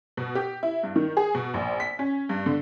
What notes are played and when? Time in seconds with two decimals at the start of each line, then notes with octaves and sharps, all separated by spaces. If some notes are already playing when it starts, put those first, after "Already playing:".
0.17 B2
0.35 G4
0.63 E4
0.83 G2
0.96 D#3
1.17 G#4
1.35 B2
1.54 A#1
1.80 B6
1.99 C#4
2.29 G2
2.46 D3